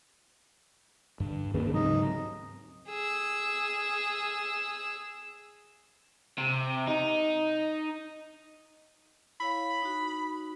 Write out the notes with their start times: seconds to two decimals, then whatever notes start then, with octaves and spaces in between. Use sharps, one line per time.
1.20 G2 D3
1.54 D2 D#3 A#3 C#4 G#4 B4
1.73 G#2 C#3 F#3 C4 D#4
2.89 G#4 E6
6.38 C3
6.87 D#4
9.40 E4 C#5 F5 B5
9.82 D#4 F#4